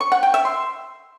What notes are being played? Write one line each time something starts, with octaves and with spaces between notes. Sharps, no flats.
C#6
F#5
G5
E5
C6